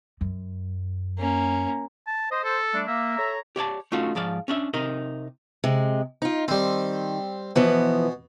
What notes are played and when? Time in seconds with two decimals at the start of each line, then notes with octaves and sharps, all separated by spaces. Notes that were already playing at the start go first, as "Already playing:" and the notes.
0.21 F#2
1.18 A#3 C#4
2.07 A5
2.31 C5 D#5
2.44 A4
2.74 G3 A3 D4
2.87 A#3 E5
3.17 A4 C#5 A#5
3.56 G4 C#5 D5 A5
3.92 A3 C#4 D#4 F4 F#4
4.15 G#2 F3 D5 F5
4.48 C#4 D4 E5
4.74 C3 D#4 A#4 D#5
5.64 C3 G#3
6.22 D#4 F4
6.48 D#3 G3 C4
7.56 B2 E3 F3 B3